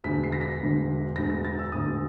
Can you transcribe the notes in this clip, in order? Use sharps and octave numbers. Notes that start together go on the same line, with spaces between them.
E1 D2 D3 B6
C7
A#6
B6
E1 D2 D3
E1 D2 D3 A#6
A#6
A6
E6
E1 D2 D3 D#6